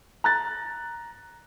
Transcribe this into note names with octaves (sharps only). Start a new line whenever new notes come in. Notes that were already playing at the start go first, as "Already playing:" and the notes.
A#5 F#6 A6